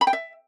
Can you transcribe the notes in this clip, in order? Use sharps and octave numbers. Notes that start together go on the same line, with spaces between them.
B5
G5
E5